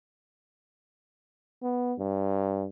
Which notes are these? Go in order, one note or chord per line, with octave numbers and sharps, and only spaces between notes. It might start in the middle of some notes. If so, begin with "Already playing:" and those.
B3
G2